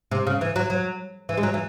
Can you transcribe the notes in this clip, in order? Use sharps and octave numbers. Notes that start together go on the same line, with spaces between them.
C3
C#3
E3
F#3
F#3
E3
G#3
F#3
E3